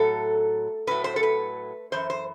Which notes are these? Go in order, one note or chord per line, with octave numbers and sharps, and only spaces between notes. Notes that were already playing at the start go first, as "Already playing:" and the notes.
Already playing: A2 F#3 A4
A2 F#3 B4
C5
A4
B4
F#2 E3 C5
C5